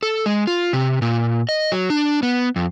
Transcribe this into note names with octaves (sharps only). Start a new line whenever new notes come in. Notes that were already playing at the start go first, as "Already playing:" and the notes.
A4
G#3
F4
C3
A#2
D#5
F#3
D4
B3
F2